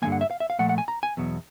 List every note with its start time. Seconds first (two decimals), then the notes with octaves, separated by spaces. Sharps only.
0.02 G2 D3 F3 A#3 G#5
0.12 F#5
0.21 E5
0.31 F5
0.40 E5
0.50 F5
0.59 A#2 F3 A3 F#5
0.69 F#5
0.78 G#5
0.88 A#5
1.03 G#5
1.17 E2 B2 F#3